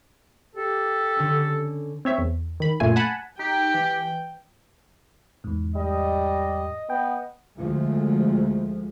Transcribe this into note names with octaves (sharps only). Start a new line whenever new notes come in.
G4 A4
D3 C#4
C4 C#5 E5
E2
D#3 B5
F#2 A#2 A3 F4 G#5
F#5 G#5 A5 B5
D#4 G4 G5
E3
E2 G#2
G3 D#5
B3 G5
D2 F3 G#3 A3